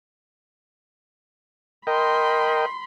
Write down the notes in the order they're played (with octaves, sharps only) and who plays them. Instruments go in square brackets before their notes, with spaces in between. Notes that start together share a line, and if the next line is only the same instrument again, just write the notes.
[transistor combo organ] A#4 D#5 G5 [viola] B5 C6